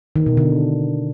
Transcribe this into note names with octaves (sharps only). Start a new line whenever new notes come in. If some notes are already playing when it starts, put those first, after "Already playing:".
D#3
B2
D3